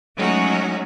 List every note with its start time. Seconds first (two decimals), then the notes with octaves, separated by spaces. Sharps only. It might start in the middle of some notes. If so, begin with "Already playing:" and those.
0.16 F#3 G#3 A3 C#4 D#4 F#4